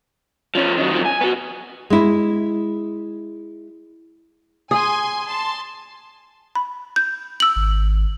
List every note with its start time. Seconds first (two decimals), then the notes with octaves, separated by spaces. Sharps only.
0.55 F3 C#4
0.77 D#3 F#3
0.93 F#2 F3
1.05 G#5
1.21 B3 F#4
1.90 G#3 E4
4.71 G#4 G#5 C6
5.26 A5 C6
6.55 B5
6.96 G6
7.40 E6 F#7
7.56 G#1